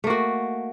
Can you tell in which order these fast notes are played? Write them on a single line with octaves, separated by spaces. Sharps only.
A3 A#3 F#4